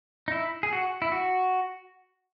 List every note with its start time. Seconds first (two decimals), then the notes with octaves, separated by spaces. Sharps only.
0.28 D#4
0.32 E4
0.63 G#4
0.73 F#4
1.02 E4
1.12 F#4